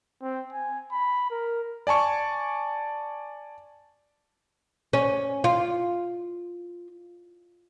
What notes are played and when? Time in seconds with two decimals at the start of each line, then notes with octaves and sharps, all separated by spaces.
0.22 C4
0.53 G#5
0.92 B5
1.31 A#4
1.87 D5 G#5 A5 C#6
4.93 C#4
5.44 F4